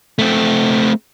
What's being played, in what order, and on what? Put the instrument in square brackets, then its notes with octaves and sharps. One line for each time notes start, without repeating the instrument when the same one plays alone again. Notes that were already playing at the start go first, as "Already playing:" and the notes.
[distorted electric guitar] A3 C4